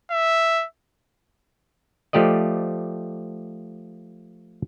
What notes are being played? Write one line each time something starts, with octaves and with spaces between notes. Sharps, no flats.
E5
F3 A3 G4 D5 D#5